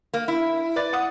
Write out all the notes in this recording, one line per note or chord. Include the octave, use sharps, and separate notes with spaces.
A#3
E4
B4 D5 A6
F#5 D#6